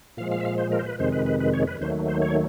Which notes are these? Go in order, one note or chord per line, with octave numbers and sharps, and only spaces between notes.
A#2 F3 G#3 F5
F5
E5
F5
C5
A#4
C5
B4
F2 C3 D#3 G#3 C5
B4
B4
B4
C#5
B4
D#2 D#3 F#3 A3 C5
C5
C#5